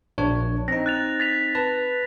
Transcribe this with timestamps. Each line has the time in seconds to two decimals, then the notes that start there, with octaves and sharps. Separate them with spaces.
0.18 A#1 D4 C#5
0.68 C4 D#4 A#6
0.86 F#6 A6 F7
1.20 A6 B6 F7
1.55 B4 A5